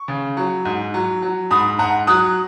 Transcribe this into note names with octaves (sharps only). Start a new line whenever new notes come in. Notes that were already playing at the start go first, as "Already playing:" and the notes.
Already playing: C#6
C#3
F#3
G#2
F#3
F#3
G#2 B5 D#6
G#2 F#5 A#5
F#3 D#6 F#6